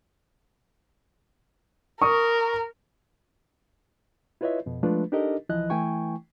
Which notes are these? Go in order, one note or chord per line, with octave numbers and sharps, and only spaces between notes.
A#4 C#6 D#6
E4 F4 B4 C#5 D#5 E5
F2 B2
F3 G#3 A3 D4 F4 B4
D4 D#4 G4 A4 A#4 D#5
C2 E3 F3 E4 D#5 F#6
E3 A3 E4 G5 G#5 C#6